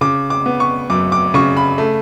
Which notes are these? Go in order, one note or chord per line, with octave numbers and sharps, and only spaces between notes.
C#3 D6
D6
B3
C#6
F#2 D6
D6
C#3 C#6
B5
A3